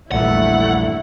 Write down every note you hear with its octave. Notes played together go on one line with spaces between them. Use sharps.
A#1 E2 G2 A3 E4 F#5